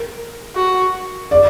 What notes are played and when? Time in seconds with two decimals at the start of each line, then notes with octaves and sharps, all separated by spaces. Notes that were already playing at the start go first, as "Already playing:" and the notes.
Already playing: A#4
0.55 F#4
1.31 D5